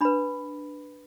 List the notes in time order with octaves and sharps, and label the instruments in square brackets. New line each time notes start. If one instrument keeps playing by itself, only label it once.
[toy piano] D4 B4 B5